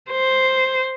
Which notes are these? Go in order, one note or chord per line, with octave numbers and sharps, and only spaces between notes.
C5